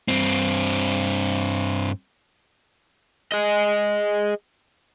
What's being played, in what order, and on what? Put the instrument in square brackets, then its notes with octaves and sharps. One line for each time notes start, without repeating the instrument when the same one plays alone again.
[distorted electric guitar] G2 C4
[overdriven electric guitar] G#4 D#5